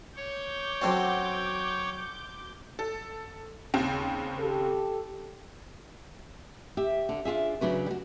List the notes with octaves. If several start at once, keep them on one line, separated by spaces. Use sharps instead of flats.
C#5 D6 G6
F#3 C4 C#4 F#4 A4 C5
A4
D#2 C#3 C4
G4 A4
G4 E5
D3
D4 F4 G#4 E5
C#3 F#3 D4 B4
G3 F#4